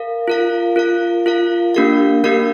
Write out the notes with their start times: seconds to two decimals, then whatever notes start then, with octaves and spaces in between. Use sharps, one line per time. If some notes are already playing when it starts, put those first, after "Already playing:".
Already playing: A#4 F5
0.28 F4 A#4 F5
0.76 F4 A#4 F5
1.26 F4 A#4 F5
1.74 A#3 D4 G4 A#4 F5
2.24 A#3 D4 G4 A#4 F5